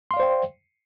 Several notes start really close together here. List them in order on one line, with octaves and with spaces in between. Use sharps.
C6 F5 D5 C5 G5